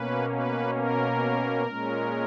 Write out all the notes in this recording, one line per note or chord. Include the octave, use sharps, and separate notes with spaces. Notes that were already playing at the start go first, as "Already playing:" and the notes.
Already playing: B2 A#3 C#4 B4
B4
A#4
A#2 G#3 C#4